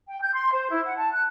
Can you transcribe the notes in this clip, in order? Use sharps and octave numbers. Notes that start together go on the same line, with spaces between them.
G5
G6
C6
C5
E4
F#5
A5
F#6